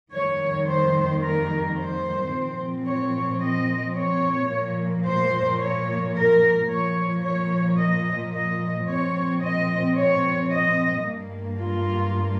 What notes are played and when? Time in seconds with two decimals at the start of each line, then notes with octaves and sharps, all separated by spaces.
0.13 F2 D#3 G3 A#3 C#5
0.68 C5
1.22 A#4
1.77 C5
2.32 A#2 F3 C4
2.86 C#5
3.41 D#5
3.95 C#5
4.50 A#2 F3 A#3
5.05 C5
5.59 C#5
6.14 A#4
6.68 A#2 F3 A#3 C#5
7.23 C#5
7.78 D#5
8.33 D#5
8.87 A#2 F3 C4 C#5
9.41 D#5
9.96 C#5
10.51 D#5
11.05 G2 G3 A#3
11.60 F4